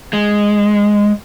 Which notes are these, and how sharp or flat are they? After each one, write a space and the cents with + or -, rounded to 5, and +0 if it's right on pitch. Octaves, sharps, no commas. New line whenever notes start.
G#3 -5